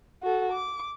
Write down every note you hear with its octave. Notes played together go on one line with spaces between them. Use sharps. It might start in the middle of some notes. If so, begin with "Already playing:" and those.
F#4 A4
D6